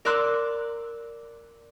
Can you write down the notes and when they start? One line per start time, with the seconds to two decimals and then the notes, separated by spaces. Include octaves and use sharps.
0.05 A#4 D5 C6 D6 E6 F#6